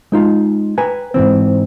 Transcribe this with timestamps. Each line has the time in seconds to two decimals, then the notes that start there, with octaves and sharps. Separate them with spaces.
0.12 G#3 D#4 F4
0.78 B4 G5 G#5 A#5
1.14 G#2 B2 E3 C4